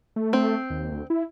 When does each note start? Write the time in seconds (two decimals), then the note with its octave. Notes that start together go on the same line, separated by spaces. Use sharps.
0.16 A3
0.33 C4
0.70 D#2
0.91 D2
1.10 E4